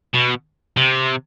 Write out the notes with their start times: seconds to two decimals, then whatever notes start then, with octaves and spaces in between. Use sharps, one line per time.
0.14 B2
0.77 C3